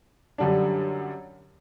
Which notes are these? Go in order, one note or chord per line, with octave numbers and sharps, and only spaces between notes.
F#2 D3 G3 D4